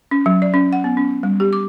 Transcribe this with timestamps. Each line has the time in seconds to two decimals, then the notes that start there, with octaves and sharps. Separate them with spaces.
0.11 C#4
0.26 F#3
0.42 D5
0.54 C#4
0.73 F#5
0.84 B3
0.97 C#4
1.23 G3
1.40 G4
1.53 D6